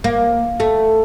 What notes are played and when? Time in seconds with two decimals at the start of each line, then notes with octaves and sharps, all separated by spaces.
0.04 A#3
0.60 A3